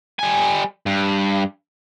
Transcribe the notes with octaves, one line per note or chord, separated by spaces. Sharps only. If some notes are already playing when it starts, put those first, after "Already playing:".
G3 G#5
G2